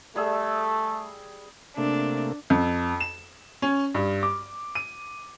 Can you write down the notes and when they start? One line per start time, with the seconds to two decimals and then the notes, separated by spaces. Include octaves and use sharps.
0.16 G3 A3 G#4 E6
1.78 C3 A3 A#3 D4
2.50 F2
3.00 E7
3.62 C#4
3.95 G2
4.23 D6
4.75 D#7